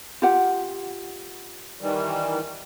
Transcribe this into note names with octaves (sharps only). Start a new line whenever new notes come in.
F4 G4 F#5
D#3 E3 G3